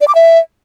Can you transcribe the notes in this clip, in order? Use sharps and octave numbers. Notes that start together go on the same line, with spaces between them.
D5
D6
E5